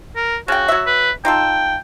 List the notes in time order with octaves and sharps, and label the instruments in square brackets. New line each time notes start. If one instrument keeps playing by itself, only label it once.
[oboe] A#4
[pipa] C#3 G5 [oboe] F#4
[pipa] F#3 E5
[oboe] B4
[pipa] D#4 F4 A4 [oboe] G5